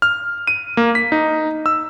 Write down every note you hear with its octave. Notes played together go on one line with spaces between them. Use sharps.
F6
D#7
A#3
B6
D#4
E6